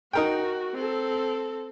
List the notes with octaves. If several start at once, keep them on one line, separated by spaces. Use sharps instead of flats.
D#4 F#4 A#4 G5
C4 A4